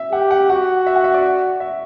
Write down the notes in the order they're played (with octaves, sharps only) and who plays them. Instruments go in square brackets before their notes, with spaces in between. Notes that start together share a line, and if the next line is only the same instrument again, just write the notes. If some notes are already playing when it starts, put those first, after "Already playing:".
Already playing: [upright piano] E5
[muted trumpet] G4 [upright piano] F#5
[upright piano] F#5
[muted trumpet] F#4 [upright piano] F#5
[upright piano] E5
F#5
E5
D5
E5